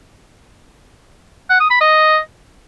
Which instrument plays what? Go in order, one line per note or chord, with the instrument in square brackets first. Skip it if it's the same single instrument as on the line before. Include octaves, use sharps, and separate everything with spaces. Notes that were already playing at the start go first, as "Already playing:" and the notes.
[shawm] F#5
D#6
B5
D#5